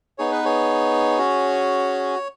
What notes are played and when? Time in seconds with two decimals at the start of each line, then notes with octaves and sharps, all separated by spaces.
0.18 B3 D#4 G#4 C#5
0.32 B4
0.45 G#4 C#5
1.18 C#4 F#4